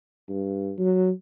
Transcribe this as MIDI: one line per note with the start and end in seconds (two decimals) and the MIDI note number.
0.29 0.73 43
0.78 1.10 54